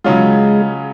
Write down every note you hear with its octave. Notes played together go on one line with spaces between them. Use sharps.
C#3 F#3 G#3 C#4 F4